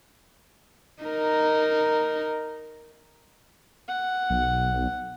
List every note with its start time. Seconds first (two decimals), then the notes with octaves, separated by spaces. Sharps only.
1.02 D#4 A#4
3.88 F#5
4.30 B1